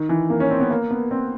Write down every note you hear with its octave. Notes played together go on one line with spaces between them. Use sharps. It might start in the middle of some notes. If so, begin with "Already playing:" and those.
Already playing: D#3
E3
A#3
C#4
C4
B3
A#3
B3
C4